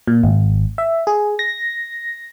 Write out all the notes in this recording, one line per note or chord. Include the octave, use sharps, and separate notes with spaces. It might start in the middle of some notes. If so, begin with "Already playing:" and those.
A#2
G#1
E5
G#4
A#6